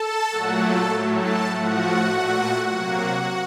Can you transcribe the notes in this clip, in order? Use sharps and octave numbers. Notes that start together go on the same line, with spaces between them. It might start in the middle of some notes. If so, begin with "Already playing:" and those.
Already playing: A4 A5
A#2 F#3 A3 F#4 F#5
A4 A5
A2 F#3 A3
A4 A5
A2 F3 A3 F#4 F#5
A#2 A3
C3 F#3 A#3 F#4 F#5